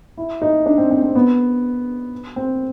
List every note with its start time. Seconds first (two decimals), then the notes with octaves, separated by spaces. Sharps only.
0.17 E4
0.42 D#4
0.66 D4
0.78 C4
0.91 C4
1.02 C4
1.15 B3
2.36 C4